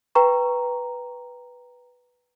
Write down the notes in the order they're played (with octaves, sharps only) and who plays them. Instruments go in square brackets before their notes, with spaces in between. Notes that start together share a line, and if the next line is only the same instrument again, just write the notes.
[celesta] B4 G5 A#5 C#6